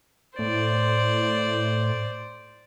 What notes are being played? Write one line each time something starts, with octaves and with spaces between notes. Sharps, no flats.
A2 C5 D5